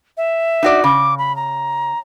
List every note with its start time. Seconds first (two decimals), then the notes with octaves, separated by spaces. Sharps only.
0.17 E5
0.63 D#4 F#4 D5
0.84 C#3 D6
1.18 B5
1.36 A#5